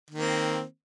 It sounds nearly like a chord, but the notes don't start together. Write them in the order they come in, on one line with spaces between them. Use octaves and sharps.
D#3 A#3 C4